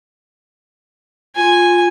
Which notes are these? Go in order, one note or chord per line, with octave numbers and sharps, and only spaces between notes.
F4 G#5